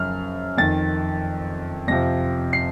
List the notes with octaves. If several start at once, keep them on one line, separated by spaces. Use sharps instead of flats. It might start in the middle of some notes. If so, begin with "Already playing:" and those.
Already playing: F#2 C#3 F3 F6
F2 D#3 A6
F2 C3 F3 A#6
C7